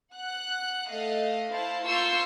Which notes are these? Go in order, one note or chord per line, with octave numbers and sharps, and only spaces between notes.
F#5 F#6
A3 D#5 F5
E4 C5 F5 A5
A#3 F4 C6 C#6 E6 G6